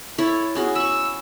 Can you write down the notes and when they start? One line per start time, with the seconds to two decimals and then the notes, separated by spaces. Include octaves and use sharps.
0.18 E4 A4 C#5
0.55 B3 C#4 F#4 G#4
0.75 B5 C#6 E6